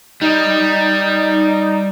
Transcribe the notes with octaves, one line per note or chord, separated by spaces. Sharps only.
G3 D#4